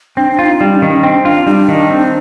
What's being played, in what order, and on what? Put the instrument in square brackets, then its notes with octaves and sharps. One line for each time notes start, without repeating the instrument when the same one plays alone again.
[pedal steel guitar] C4 [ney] D4
[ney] D4
[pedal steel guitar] F4
[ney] D#4
[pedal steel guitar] G3 [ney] D4
[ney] C#4
[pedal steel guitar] D#3
[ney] C#4
[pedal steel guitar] C4 [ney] D4
[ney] D4 [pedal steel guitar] F4
[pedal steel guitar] G3 [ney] D#4
[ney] D4
[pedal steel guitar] D#3
C4